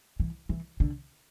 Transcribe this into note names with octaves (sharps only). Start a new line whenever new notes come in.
E3
E3
D3